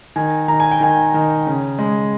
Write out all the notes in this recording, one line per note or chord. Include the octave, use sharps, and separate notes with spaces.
D#3 G#5
D#3 A#5
G#5
G5
D#3 G#5
D#3
C#3
G#3